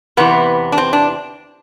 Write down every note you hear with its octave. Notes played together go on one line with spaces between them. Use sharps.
E2 C3 E3 B3
D4
C4
D4